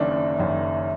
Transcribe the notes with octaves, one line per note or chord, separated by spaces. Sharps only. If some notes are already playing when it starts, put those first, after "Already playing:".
Already playing: F#1 F#2 D#3 D4
F#1 F#2 D#3